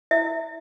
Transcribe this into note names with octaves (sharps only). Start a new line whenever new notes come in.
E4 E5